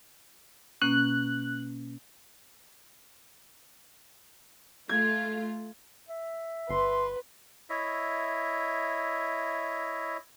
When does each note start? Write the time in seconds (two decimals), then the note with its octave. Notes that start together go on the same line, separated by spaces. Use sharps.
0.82 B2 A#3 C#4 F#6
4.89 A3 F4 G#6
6.09 E5
6.70 G1 B4 C6
7.70 E4 C#5 D#5 E5